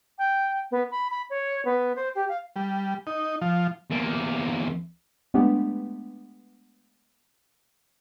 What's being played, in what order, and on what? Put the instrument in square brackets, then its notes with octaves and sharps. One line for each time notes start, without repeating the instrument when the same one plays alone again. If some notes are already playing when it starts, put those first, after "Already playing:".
[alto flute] G5
B3
B5
B5
C#5
B3
C5
G4
F5
[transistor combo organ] G3
D#4
F3
[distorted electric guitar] E2 A#3
[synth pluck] G#3 A3 B3 D4 G4